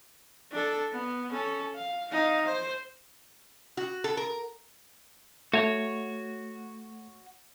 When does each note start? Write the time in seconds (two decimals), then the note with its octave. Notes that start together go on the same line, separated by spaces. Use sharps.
0.51 D4 A4
0.92 B3
1.32 C#4 A4
1.75 F5
2.11 D#4 F5
2.46 C5
3.77 F#4
4.04 A4
4.17 A#4
5.54 A3 F#4 C#5